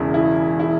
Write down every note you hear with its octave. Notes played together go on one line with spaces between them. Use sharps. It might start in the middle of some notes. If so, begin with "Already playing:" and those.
Already playing: E1 E2 C#3 E4
E4
E4